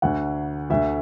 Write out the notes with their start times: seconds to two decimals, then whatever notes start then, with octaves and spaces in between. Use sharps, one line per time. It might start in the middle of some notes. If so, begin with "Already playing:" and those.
0.02 D2 D3 F#5
0.70 D2 D3 E5